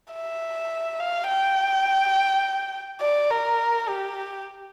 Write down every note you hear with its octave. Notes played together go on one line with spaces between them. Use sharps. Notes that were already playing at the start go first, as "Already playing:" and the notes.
E5
F5
G5
D5
A#4
G4